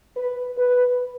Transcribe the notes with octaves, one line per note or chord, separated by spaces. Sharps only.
B4
B4